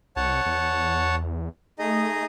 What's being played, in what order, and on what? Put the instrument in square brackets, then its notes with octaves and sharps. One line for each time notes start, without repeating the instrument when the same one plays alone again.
[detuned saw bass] C2 [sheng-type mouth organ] C#5 F#5 A5
[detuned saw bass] E2
[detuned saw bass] A3 [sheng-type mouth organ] D#4 G#4 D#5